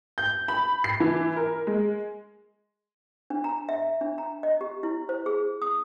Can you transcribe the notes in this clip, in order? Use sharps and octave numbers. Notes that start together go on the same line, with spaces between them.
G6
B5
C7
E3
A#4
G#3
D4
A#5
E5
D4
A#5
D#5
G4
E4
C5
G#4
D#6